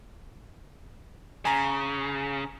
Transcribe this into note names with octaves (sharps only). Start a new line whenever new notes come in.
C#3 G#5 A#5